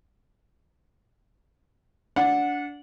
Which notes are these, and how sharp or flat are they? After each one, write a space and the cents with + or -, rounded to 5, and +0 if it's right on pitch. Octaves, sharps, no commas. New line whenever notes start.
D4 -20 F#5 -15